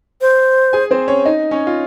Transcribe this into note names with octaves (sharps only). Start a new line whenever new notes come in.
C5
G#4 G#5
C4 C5
C#4 C#5
D#4 D#5
C#4 C#5
F4